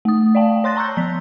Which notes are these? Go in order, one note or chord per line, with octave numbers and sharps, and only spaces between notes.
A3 D#6
D5 F5 G5 A5
C#5 C6 F#6 A6 A#6
A5 A#5 C#6 E6 F#6 G6
F3 B6